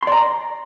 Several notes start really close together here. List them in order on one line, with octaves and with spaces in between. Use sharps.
C6 D5 A#5